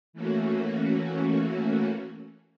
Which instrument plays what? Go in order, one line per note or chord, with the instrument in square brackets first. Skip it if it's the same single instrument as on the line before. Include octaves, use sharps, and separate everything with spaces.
[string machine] E3 A3 A#3 C#4 F#4